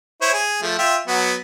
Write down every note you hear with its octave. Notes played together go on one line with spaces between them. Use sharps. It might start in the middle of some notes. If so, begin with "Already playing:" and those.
E4 C5 C#5
G#4
F3 A3
F4 E5 G5
F#3 B3